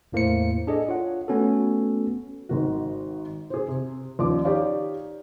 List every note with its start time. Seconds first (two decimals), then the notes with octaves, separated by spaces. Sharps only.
0.12 E2 A2 A#3 E4 C5 C#7
0.67 D4 G#4 A4 D#5
0.88 F4 C#5 F#5
1.28 A3 B3 C#4 F#4 A4
2.49 G#1 D#3 F#4
3.50 G#4 C5
3.68 C3
4.19 D#2 F3 C#4 D5 D6
4.45 D#4 G4 C#5 D5 F5